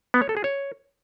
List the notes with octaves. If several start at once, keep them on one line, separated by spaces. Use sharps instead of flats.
B3
C#5
A4
G#4
C#5